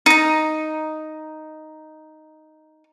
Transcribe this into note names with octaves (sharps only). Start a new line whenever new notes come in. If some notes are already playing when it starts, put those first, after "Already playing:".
D#4 A#5